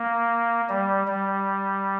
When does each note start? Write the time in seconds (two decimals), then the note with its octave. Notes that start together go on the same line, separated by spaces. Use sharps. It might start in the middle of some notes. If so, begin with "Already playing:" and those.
Already playing: A#3
0.69 G3
1.07 G3